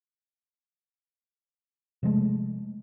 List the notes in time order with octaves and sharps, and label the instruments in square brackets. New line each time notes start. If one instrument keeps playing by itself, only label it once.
[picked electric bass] C3 F3 G#3 A3